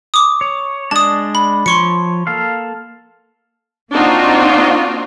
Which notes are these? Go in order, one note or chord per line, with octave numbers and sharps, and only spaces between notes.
D6 D#6
C#5
G#3 D4 D5 A5 D#6
B5
F3 C#5 C6 C#6 C#7
A#3 A4 F5
A#3 C4 D4 D#4 F4 F#4